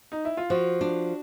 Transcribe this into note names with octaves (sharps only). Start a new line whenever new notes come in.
D#4
E4
F4
F3 F#4
D4